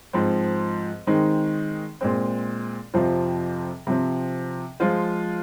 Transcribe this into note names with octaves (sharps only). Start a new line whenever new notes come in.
G#2 F3 C4
D#3 G#3 C4 D#4
A#2 G#3 C4
F2 C3 F3 C4 F4
C3 F3 C4
F3 G#3 F4 C5